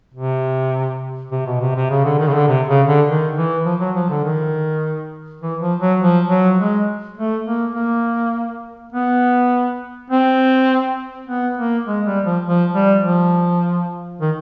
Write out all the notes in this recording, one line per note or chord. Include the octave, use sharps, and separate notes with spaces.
C3
C3
B2
C3
C3
C#3
D3
D#3
C#3
D3
C3
C#3
D3
D#3
E3
F3
F#3
F3
D3
D#3
E3
F3
F#3
F3
F#3
G#3
A3
A#3
A#3
B3
C4
B3
A#3
G#3
G3
F3
F3
G3
F3
D#3